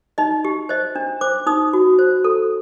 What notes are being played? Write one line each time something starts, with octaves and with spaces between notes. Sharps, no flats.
D#4 D#5
G4
C5 D#5
D4
C5 D6
D#4 D#6
F#4
C5
A4